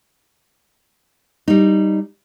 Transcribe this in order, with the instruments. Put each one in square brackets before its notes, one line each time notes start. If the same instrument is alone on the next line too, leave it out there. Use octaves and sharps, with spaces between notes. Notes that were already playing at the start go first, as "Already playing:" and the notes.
[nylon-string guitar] G3 D#4